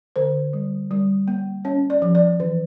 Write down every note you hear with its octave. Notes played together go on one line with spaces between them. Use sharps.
D3 C5
G3
G3
A#3
C#4 C#5
D5
F3
D5
E3